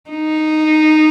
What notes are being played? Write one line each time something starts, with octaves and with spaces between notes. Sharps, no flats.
D#4